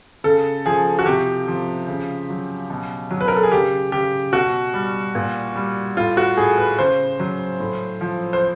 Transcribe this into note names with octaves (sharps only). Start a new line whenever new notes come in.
C#3 A4
F3 G#4
F#4
C3 G4
F3
C#3
F#3
B2
F#3
B4
A#4
A4
G#4
C#3 G4
C#3 G4
B2 F#4
G3
A#2
G3
A2 F4
F#4
A2 G#4
B4
C#3 C5
F#3
A2
F3
C5